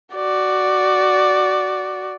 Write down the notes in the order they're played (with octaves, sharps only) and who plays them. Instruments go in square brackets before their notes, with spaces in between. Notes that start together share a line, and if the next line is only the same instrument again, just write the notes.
[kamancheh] F#4 D5